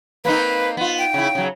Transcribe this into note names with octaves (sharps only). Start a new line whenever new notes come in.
A#3 C4 D#4 B4
B3 F4
G5
C#3 E4
C#3 F#3